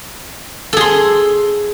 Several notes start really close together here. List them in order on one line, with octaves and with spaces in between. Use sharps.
A4 G#4 C6